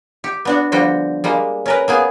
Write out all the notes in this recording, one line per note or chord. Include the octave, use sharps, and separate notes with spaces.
G4
B3 D4 F#4
D3 F3 G3 F#4 G5
G3 G#3 A#3
C#4 A#4 B4
A#3 B3 G#4